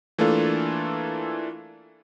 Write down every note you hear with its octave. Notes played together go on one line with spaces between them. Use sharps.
E3 A3 A#3 D4 F4 A4